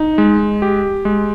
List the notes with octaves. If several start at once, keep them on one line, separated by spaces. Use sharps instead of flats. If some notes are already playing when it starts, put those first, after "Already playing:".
Already playing: D#4
G#3
G4
G#3